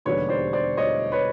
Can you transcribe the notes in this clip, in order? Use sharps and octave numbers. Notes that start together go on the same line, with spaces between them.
E1 D#2 D3 G3 B4 C#5
C5 D5
C5 D5
C#5 D#5
B4 C#5